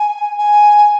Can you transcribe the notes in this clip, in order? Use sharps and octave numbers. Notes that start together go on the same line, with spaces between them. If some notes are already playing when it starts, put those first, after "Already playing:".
Already playing: G#5
G#5